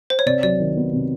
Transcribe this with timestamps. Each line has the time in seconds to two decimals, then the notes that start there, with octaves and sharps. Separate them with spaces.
0.10 C5
0.19 C#5
0.26 C3 D5
0.43 F#3 D5
0.60 D#3
0.77 B3
0.93 C3